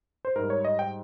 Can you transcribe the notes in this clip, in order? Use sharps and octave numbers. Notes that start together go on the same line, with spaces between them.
C5
G#2 G3 A#4
C#5
D#5
G5